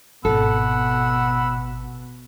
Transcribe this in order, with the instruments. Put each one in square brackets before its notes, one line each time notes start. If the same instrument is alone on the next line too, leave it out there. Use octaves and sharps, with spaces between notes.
[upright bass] G#1 [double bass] B2 [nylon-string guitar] A4 [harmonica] F#5 B5 E6